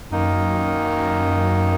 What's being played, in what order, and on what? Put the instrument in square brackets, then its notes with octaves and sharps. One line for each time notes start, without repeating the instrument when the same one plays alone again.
[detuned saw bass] F#2 [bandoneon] D#3 A#3 D#4